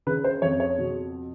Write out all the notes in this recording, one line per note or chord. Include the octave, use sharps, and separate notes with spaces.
C#3 B4
C5
F2 C#5
C#5
B2